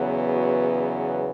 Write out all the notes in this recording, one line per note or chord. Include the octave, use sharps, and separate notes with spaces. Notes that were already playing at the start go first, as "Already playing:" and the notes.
Already playing: E2 C#3 F#3 B3
F#4